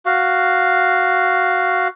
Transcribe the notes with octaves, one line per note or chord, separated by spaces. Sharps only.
F#4 F5